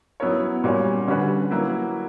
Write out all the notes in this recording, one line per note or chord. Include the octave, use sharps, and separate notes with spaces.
F#3 B3 E4 A#4 C#5
A#2 G3 C#4 F#4 C#5
D3 G3 C#4 F#4 B4
F#3 A#3 E4 B4